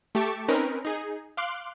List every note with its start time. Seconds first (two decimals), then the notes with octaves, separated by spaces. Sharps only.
0.15 A3 G4 A5 C#6 D6
0.48 C4 C#4 D#4 A#4 B4
0.85 D#4 G#4
1.37 F5 C6 D6 F#6